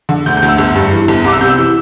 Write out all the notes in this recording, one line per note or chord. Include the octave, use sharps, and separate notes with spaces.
D3
D2 G6
G6
D2
E6
G1
G2
E3
G1
C2 D6
E6
C3 G6
E6
E3